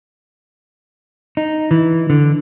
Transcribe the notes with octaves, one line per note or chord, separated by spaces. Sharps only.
D#4
E3
D3